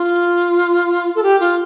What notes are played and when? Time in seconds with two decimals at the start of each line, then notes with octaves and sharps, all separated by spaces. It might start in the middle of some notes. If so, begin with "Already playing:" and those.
Already playing: F4
1.15 A4
1.23 G4
1.40 F4